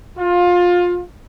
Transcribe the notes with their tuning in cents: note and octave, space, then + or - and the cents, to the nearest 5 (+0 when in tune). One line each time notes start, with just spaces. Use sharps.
F4 +20